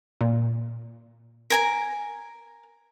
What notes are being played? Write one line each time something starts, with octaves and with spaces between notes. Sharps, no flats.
A#2
A#4 G#5 A#5 A#6